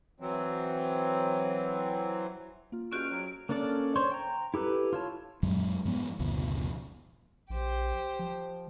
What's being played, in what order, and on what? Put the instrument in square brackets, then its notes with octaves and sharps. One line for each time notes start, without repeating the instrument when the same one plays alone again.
[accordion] E3 F#3 C4
[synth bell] A#3 F4
[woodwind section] G2 G#3 F6 [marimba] C#4 F#4 G6 [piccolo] D7
[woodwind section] F2 F#3
[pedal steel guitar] A#3 C#4 D4 A4 D5
C5 C#5 C6 C#6
G5 A#5
E4 G4 A4 B4
F4 C#5 A5
[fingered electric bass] F#2 A#2 F#3 G#3
G2 F3 G#3 B3
F#1 D2 B2 F3
[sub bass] A#1 [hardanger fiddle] G4 C5
[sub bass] F3